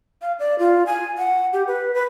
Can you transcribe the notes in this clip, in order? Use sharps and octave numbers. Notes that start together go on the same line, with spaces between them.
F5
D5
F4
G#5
F#5
G4
B4
B4